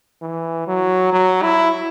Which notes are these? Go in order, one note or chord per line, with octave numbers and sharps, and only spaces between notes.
E3
F#3
F#3
E4